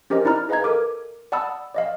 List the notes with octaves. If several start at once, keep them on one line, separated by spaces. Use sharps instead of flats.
C#4 G4 A#4 C5 D#5
D#4 E4 D5 A#5 F6
G#4 B4 D#5 F5 A#5 G#6
A4 A#4 D6
D5 F#5 A5 B5 D#6 E6
D5 D#5 F5